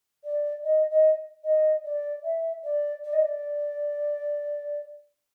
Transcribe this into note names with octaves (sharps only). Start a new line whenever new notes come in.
D5
D#5
D#5
D#5
D5
E5
D5
D5
D#5
D5